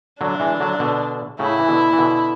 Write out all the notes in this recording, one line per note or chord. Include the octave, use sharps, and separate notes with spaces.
D3 F#3 D4
E3 G#3
D3 F#3
B2 D3
A2 C#3 E4
E3
B2 D3
E3
B2 D3